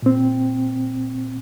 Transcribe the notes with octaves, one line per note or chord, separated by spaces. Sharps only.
A#2 C4